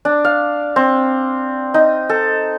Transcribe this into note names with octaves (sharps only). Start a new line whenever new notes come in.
D4
F5
C4
D#4
A4